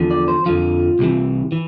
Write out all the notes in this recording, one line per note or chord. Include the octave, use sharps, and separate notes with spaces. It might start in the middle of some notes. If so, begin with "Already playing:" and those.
Already playing: E2 D3 F3
D5
C5
F2 D3 F3 F4
C2 C3 E3
E3